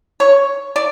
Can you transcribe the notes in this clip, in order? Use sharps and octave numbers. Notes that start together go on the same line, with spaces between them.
C#5
D5